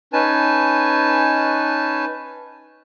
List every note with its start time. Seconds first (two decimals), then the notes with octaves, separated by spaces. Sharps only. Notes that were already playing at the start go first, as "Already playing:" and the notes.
0.13 C#4 D#4 B4 G#5 A5